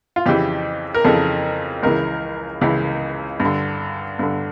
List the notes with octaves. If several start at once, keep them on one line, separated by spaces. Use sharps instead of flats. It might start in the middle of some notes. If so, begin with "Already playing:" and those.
F4
F2 C#3 E3 G4
A#4
F2 C#3 E3 A4
C#2 C#3 E3 A#4
C#2 C#3 E3
G2
D3
G2 D3